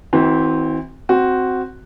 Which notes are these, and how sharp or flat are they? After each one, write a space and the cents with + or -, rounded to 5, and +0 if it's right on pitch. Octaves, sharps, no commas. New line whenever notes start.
E3 -40 C4 +0 F#4 +0
C4 +0 F#4 +0